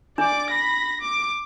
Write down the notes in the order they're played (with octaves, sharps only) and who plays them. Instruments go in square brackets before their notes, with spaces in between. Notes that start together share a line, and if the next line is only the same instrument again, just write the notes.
[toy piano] D4 [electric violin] D5 D6
[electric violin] B5 A#6
D6